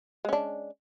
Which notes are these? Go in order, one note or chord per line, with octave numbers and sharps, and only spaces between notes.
G#3 C#4 D4